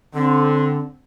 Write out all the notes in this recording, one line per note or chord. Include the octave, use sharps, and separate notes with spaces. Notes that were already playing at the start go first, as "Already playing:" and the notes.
D3 C4